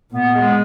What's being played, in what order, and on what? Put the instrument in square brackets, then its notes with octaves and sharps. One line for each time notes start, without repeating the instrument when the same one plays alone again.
[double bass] A#2 [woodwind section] B3
[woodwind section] G#3